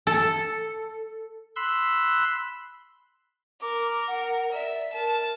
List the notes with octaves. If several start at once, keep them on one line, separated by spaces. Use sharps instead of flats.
A4
B5 C6 E6 F#6
A#4 D6
F#5
D5 E5
A#4 A5